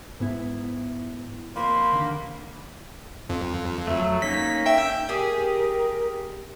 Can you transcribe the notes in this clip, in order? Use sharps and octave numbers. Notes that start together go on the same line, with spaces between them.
G#2 B3 E4
F2 A#3 C5 B5
D#2 D3
F2
F#3 A3
A#3 C#4 D#4 B6
E5 G5
G4 G#4 A#4